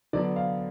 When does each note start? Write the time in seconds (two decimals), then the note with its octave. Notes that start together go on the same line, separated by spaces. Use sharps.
0.13 D3 F#3 B3 D4 D5
0.36 F5